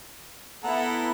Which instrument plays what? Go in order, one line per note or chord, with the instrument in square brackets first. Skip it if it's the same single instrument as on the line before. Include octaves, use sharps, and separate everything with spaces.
[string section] B3 E4 [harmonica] A4 F#5 A#5